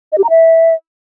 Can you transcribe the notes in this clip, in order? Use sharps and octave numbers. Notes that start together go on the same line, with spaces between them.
D#5
G4
A#5
E5